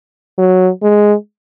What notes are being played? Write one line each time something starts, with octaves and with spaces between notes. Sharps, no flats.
F#3
G#3